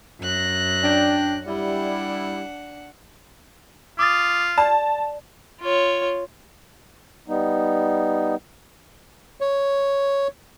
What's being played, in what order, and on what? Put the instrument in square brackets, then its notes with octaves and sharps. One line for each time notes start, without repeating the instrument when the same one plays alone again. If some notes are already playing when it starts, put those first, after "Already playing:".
[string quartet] F#2 F#6 A#6
[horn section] D4 G5
[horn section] G3 E4 [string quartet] D4 F#5
[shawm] F4 [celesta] D6 D#6 A6
[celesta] D5 [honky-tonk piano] A5
[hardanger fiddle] F4 C#5
[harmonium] G3 B3 D#4
[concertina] C#5